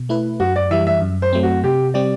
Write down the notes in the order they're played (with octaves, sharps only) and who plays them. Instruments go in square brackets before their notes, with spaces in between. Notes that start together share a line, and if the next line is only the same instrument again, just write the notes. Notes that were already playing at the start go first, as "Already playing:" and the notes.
Already playing: [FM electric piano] B2
A3 E4 B4
[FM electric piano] F#2 [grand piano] F#4
[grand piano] D5
[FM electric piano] E3 G3 [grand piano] E5
[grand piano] E5
[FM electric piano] F#2
[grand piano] C5
[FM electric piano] F#3 A3 C4
[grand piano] F#4
[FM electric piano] C3 [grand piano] G4
[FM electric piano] G3 C4 G4 [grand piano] D5